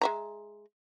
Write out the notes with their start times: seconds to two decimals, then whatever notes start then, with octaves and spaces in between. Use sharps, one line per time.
0.01 G#3 E5 A#5